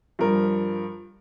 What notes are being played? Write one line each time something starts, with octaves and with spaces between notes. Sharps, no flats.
G2 F3 A#4